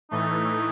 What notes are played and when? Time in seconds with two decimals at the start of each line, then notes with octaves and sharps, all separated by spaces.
0.11 A2 E3 A3 D#4